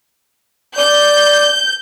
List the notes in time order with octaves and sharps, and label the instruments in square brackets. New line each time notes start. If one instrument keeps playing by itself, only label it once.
[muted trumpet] D5 [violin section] G6